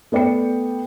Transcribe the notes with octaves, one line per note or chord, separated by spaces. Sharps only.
A3 B3 D5 G5 C#7